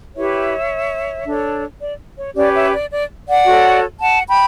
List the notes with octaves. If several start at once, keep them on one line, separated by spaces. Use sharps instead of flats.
E4 G4 B4 C#5 E5
D4 A4 C#5
D5
C#5
C#4 G4 B4 D5
C#5 E5
D5
D5
D5 F#5
F#4 A4 C#5
F#5 A5
G5 B5